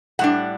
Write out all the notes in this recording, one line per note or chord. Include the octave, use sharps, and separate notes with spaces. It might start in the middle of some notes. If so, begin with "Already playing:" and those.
A2 G3 D4 F#5